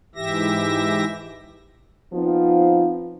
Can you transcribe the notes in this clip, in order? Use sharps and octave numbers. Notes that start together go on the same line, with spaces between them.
G#2 E3 G4 E5 A#6
F3 B3 C4 D#4 F4